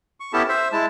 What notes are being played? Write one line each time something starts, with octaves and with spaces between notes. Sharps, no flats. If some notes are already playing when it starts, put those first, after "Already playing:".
C#6
B3 C#4 E4 G4 A4 A5
C5 E5
G#3 E4 A5